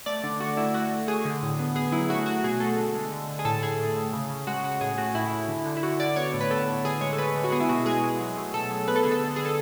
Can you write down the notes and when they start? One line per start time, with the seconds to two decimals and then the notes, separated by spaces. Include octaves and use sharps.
0.06 A3 D5
0.23 D3
0.40 A3 F#4
0.57 A3 E4
0.74 A3 F#4
0.91 A3
1.07 A3 G#4
1.25 D3
1.43 A2
1.59 B3
1.75 B3 G#4
1.92 F#3 E4
2.09 A3 F#4
2.26 A3 F#4
2.44 B2 G#4
2.60 A3 A4
2.78 D3
2.94 G#3
3.12 D3
3.28 D3
3.39 G#4
3.45 A2 A4
3.62 A2 G#4
3.79 A2
3.96 A2
4.13 C#3
4.30 C#3
4.47 G#3 F#4
4.64 C#3 F#4
4.81 A2 G#4
4.98 A3 F#4
5.15 A2 E4
5.32 A2
5.48 D3
5.66 D3
5.77 E4
5.83 D3 F#4
6.00 D3 D5
6.16 B3 C#5
6.34 A2
6.41 B4
6.50 B3 A4
6.68 A2
6.85 D3 G#4
7.01 G#3 C#5
7.13 A4
7.18 D3 B4
7.35 D3
7.44 F#4
7.52 B3 G#4
7.60 E4
7.69 B2 F#4
7.86 G#3 G#4
8.03 G#3
8.21 F#3
8.37 A3
8.54 B2 A4
8.71 F#3
8.88 B3 B4
8.96 A4
9.03 D3 G#4
9.12 A4
9.21 D3
9.36 D3 G#4
9.45 A4